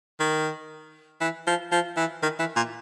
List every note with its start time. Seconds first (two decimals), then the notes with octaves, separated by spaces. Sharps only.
0.20 D#3
1.21 E3
1.47 F3
1.72 F3
1.97 E3
2.23 D#3
2.39 E3
2.56 A#2